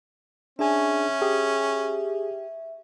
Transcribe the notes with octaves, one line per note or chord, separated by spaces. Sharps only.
C#4 D4 G#4 E5 G#5
G4 G#4